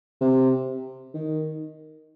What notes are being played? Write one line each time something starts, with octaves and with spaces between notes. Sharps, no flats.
C3
D#3